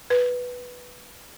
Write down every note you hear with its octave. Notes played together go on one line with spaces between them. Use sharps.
B4